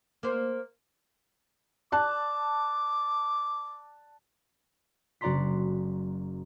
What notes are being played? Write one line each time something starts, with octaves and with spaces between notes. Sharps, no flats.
A#3 C5
D5 A5 D6 F#6
F#1 F#4 D5 A#5 C6 B6